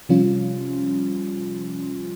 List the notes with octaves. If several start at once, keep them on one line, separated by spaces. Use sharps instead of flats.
C3 F3 G3 C#4 F4